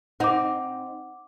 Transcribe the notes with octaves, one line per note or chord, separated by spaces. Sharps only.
C4 D#4 F#5 D6